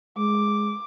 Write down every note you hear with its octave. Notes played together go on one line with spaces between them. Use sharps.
G#3 D6